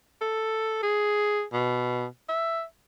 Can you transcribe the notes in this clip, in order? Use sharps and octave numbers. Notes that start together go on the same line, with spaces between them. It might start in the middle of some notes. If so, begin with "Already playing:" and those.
A4
G#4
B2
E5